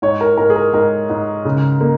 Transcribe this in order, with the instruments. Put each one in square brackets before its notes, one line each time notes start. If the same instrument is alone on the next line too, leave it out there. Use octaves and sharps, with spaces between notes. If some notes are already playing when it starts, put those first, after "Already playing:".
[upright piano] G#2 C#5
A#4
G#2 A#4
G#4
A#4
G#2 A#4
G#2
C#3
A#3